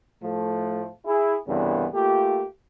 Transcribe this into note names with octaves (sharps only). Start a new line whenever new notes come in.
A2 F3 A3
E4 G#4
C2 G2 C#3 E3 B3
A3 A#3 F4 G4